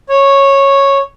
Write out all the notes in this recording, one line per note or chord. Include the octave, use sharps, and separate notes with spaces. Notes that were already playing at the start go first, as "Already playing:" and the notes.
C#5